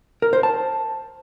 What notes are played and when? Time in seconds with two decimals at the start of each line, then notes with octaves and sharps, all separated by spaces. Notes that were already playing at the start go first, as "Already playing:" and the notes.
0.22 A#4
0.33 C5
0.43 A5